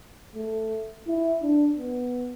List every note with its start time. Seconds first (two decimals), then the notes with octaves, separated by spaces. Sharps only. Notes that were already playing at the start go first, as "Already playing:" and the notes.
0.35 A3
1.07 E4
1.42 D4
1.78 B3